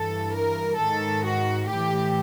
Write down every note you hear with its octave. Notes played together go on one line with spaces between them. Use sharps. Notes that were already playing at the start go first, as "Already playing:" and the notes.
Already playing: G2 E3 A4
A#4
G#2 D#3 A4
F#4
A2 G4
E3